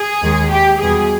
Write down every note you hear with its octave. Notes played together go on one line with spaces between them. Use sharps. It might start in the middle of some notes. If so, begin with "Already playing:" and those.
Already playing: G#4
D#2 D#3 G#3
G4
E2 B2 G3 G#4